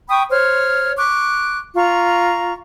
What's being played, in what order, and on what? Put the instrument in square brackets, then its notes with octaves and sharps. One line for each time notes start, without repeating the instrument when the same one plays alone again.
[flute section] G5 B5 C#6 D#6
C5 C#5 F6
C#6 D6 F#6
F4 A#5 C#6